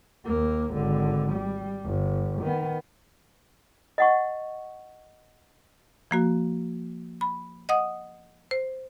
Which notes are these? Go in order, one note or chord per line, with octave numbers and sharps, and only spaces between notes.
D#2 A#3
G#1 D3
G3
G1
D#3 B3
D#5 F#5 C#6
F3 A#3 F#4
B5
D#5 F#5 D#6
C5